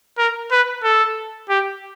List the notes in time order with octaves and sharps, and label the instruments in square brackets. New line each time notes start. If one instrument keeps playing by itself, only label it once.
[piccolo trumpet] A#4
B4
A4
G4